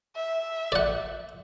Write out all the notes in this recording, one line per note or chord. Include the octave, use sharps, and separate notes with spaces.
E5
D5 F#5